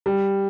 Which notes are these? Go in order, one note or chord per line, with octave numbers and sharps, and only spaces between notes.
G3